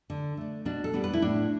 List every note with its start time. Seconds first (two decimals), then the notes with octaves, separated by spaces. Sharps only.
0.10 D3
0.37 A3 D4
0.65 B2 D4
0.84 A4
0.93 G3 B3 D4
1.04 B4
1.13 E4
1.22 A2 D4